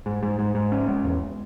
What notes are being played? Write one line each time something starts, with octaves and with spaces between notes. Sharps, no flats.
G#2
G#2
G#2
G#2
C#4
G#3
E2